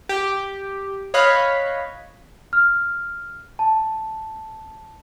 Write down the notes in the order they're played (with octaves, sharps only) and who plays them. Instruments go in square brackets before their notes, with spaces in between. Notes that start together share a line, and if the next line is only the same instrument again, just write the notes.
[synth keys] G4
C#5 D#5 F5 B5 F#6 B6
[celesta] F6
A5